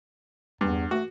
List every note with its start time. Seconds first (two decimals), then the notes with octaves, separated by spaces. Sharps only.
0.61 E2 G2
0.91 A3 F#4